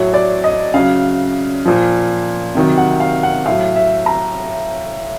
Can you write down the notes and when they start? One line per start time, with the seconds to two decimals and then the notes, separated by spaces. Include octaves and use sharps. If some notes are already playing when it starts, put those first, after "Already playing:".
Already playing: A2 F#3 C#5
0.14 D5
0.44 D#5
0.74 C#3 F#3 F5
1.65 A#2 F3
2.55 C3 D#3 F#3
2.78 F#5
3.00 F5
3.23 F#5
3.45 A2 F#3 F5
3.76 E5
4.06 A#5